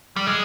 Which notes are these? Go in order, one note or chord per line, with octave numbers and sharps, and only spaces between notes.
G3
G#3